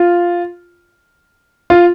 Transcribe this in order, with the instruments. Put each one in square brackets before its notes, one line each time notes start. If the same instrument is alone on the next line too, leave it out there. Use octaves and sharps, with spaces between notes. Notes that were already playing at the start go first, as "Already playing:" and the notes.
Already playing: [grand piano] F4
F4